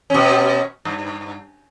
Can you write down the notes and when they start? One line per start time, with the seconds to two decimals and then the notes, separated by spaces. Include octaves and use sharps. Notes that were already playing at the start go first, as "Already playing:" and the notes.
0.10 B2 C#4
0.85 G2